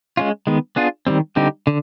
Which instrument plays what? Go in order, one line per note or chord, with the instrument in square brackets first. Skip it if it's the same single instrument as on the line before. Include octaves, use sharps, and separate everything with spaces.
[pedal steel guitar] G#3 C#4 F4
D#3 G#3 B3
B3 D4 F4 G#4
D#3 G3 C4
D3 G3 C4 D#4 G4
D3